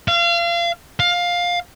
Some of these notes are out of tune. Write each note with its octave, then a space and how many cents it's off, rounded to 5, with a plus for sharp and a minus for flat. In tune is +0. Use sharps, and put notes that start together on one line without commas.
F5 -30
F5 +15